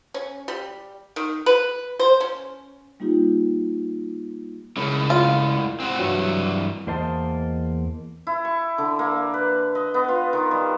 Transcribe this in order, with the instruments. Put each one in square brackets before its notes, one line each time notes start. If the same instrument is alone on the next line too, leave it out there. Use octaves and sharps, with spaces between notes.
[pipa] C#4
G3
D#3
B4
C5
C#4
[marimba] G3 A#3 D#4 F4 G4
[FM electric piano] C#3 [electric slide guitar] G#3 E4 A#4
[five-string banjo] F4
[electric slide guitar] C4 F#4
[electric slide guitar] G2 E3 [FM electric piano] F#3
[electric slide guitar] E2 A#3 C5 D#5 A5
[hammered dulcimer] E4
C#6
D3
A#3
B4
D#5
B3
F4
D#3
G3